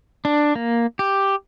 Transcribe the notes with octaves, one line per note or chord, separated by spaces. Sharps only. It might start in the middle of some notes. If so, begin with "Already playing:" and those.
D4
A#3
G4